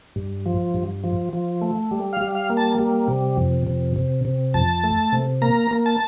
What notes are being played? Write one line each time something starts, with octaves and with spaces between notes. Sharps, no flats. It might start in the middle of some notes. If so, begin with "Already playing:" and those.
G2
F3
G2
F3
F3
A3
G3
F5
G3
F5
A#3
A5
G3
C3
F2
C3
C3
C3
F2 A5
A3
C3
A#3 A#5
A#3
A5